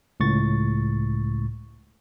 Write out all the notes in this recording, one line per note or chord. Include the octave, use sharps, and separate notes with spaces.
C#2 A2 C#6 A6